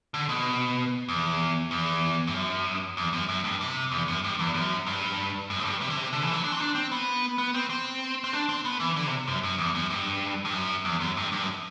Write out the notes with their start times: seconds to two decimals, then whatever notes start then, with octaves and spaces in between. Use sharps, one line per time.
0.14 D3
0.29 B2
1.09 E2
1.71 E2
2.27 G2
2.34 F#2
2.97 E2
3.13 F#2
3.29 F#2
3.44 G2
3.61 C3
3.92 E2
4.08 F#2
4.24 G2
4.39 E2
4.54 F#2
4.87 G2
5.50 F#2
5.60 A2
5.65 G2
5.81 C3
5.90 D3
5.97 C3
6.13 D3
6.23 E3
6.33 F#3
6.44 D4
6.52 C4
6.60 D4
6.75 C4
6.92 B3
7.38 B3
7.54 C4
7.70 C4
8.24 C4
8.33 D4
8.49 C4
8.65 B3
8.80 E3
8.96 D3
9.07 C3
9.28 F#2
9.43 F#2
9.58 E2
9.75 F#2
9.90 G2
10.45 G2
10.53 F#2
10.85 E2
11.00 F#2
11.17 G2
11.32 G2
11.43 F#2